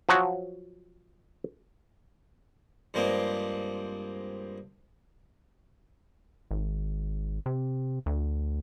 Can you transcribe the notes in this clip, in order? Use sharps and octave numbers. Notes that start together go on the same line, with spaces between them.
F3 F#3 F#4
G2 F3 G#3 A#3 C4
G#1
C3
D2